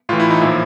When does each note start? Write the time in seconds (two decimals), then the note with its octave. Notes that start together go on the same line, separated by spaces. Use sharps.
0.09 A2 E3 F4
0.20 E4
0.30 D#4
0.41 A#2 F3 E4